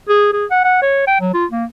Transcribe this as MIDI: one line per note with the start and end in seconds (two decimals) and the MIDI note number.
0.09 0.30 68
0.33 0.46 68
0.51 0.62 78
0.64 0.78 78
0.82 1.03 73
1.07 1.16 79
1.21 1.31 54
1.34 1.45 65
1.51 1.65 58